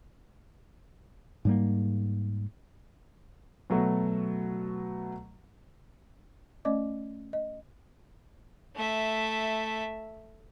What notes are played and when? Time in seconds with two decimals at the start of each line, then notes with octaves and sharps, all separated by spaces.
1.45 G#2 G3 A#3
3.70 B2 F#3 A3 F#4
6.65 A3 C#4 D5 D#5 D6
7.33 D#5
8.76 A3 E5